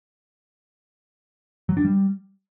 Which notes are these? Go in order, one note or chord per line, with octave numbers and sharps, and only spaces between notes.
F#3
D4
G3